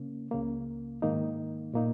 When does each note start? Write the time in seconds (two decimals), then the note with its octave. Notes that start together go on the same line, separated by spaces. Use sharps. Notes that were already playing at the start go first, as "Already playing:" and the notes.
Already playing: C#3 A#3 C#4
0.31 C#2 C#3 A#3
1.02 G#2 D#3 A#3 D#4
1.74 A#2 A#3 D#4